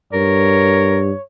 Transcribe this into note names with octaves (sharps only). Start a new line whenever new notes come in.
G2 A#4 C#5